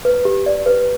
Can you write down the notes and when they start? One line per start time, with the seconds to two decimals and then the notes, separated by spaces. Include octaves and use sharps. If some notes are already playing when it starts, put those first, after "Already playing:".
0.05 B4
0.25 G4
0.46 D5
0.66 B4